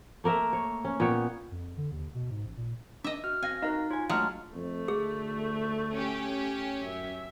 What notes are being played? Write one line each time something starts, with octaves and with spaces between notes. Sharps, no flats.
A3 A#3 A#4 E5
C#5
C#4
A#2 B3 C#5 G5
F2
D3
D#2
B2
G#2
A1
A#2
D4 D#5 E5
F#4 F6
C4 F5 G#5 A#6
D#4 F#4 A#4 D#5 F5
F4 C#5 G#5
A2 F#3 G#3 A3 D4 F5 A5 F6
F2 A3
D2 G#4
C#4 G4
F#2 E5